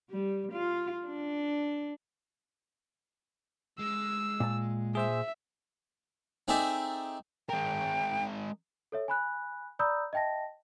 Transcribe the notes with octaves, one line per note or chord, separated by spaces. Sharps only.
G3
F4
D4
G#3 E6
A#2 A5
G#4 C5 E5 E6
C4 D#4 G#4 A4 D5 E5
G#3 A#4 G5
A4 C#5 E5
G#5 B5 F#6
D5 A#5 B5 D#6 E6 G6
D#5 E5 G5 A5 A#6